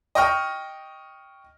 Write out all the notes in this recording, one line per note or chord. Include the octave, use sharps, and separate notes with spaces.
D#5 G5 C#6 F6